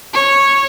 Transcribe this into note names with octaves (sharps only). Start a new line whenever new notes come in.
C#5